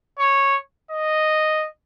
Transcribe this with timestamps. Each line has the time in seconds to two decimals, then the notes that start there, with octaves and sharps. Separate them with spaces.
0.19 C#5
0.91 D#5